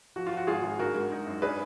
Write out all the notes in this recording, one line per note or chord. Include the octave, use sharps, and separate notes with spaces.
F3 F#4
F4
F3 F#4
G#1 F4 G#4
G#1
D3 F#4 A#4
G#3
D#4
F#2
D4 G#4 B4